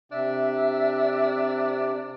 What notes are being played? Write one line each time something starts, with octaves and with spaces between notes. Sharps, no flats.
C3 D4 E5